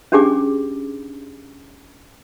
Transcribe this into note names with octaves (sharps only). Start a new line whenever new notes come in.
C#4 D4 G4 G#4 G#5 D6